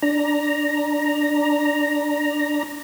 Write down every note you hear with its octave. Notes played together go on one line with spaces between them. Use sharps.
D4 A#5